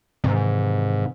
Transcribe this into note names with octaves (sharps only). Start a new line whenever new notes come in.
G#2 C3 D#3 E3